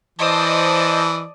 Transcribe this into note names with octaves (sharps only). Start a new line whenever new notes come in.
E3 C5 D5 D#5 A5 D#6